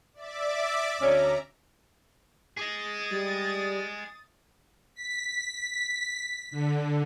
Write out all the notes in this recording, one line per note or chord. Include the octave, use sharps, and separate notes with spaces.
D5 E5 D6
D2 C#4 A#5
G#4 D#5 D#6 A6
G3
B6
D3